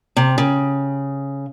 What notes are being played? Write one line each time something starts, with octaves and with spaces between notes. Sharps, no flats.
C3
C#3